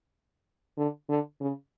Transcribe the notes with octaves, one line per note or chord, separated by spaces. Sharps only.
D3
D3
C#3